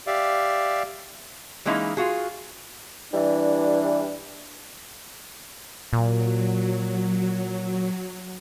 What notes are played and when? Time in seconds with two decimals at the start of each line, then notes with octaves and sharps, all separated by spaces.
0.07 G4 D5 E5 F5
1.65 E3 G#3 A#3 C#4 D#4 E4
1.97 F4 F#4 G#4
3.13 E3 G3 D4
5.93 A#2 F#3